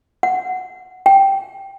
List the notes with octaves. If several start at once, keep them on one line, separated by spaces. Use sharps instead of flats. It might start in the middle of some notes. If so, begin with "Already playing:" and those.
F#5
G5